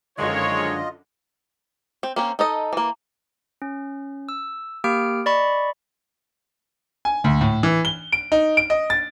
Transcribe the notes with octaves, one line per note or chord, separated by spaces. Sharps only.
F#2 D3 D#3 F3 G#3 F4 C#5 D#5
C4
A#3 C4 C#4
D#4 A4 D#5
E3 A#3
C#4
E6
A#3 G4 F6 D7
D5 D#5 B5 C#6
G#5
D2
A2
E3
G7
D7
D#4
D7
D#5
A6